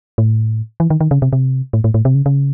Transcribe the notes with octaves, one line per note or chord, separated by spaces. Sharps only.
A2
E3
D#3
D#3
C#3
C3
C3
A2
A2
A2
C3
C#3
C#3